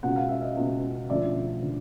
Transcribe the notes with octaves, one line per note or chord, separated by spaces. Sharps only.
C#2 B2 F#5
F5
E5
D#5 F5
C#2 B2
E1 D2 D3 F3 D5 E5
D3 F3